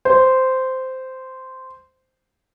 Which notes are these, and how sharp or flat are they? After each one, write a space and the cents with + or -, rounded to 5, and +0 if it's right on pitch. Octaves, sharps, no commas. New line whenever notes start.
C5 -10